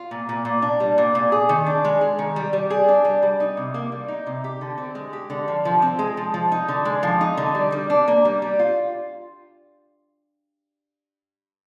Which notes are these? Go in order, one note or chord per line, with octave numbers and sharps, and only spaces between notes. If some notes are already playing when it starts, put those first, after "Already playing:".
Already playing: F4
A#2
A#2
A#2
D4
G3
A#2
A#2
G#4
D#3
D4
G#3
G#4
D#3
G3
G3
G#4
D4
G3
G3
D#4
C3
A#3
G3
D#4
C3
G4
D3
C4
G#3
G4
D3
F3
F3
C4
G#3
F3
F3
D#4
D3
G#3
F3
D#4
D3
G3
G3
D4
A#3
G3
G3
F4